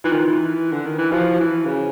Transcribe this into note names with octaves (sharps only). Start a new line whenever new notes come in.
E3 D#4 F4
D#3
E3
D3
D#3
E3
F3 E4 F#4
E3
C#3